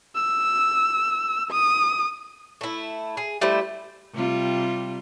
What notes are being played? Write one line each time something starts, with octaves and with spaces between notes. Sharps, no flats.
E6
D#6
A3 E4
G#4
G3 A3 E4 C5
C3 G3 F4